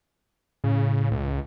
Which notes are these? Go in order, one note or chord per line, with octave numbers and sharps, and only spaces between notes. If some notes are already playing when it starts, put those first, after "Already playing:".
A2 C#3
C#2